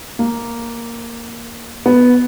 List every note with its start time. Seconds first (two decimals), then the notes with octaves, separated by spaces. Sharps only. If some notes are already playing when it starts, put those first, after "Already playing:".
0.19 A#3
1.86 B3